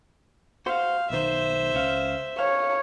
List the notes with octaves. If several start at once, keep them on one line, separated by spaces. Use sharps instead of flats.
F#4 C5 F5
B1 D#3 C5 E5
C#2 C#4 F5
C#5 F5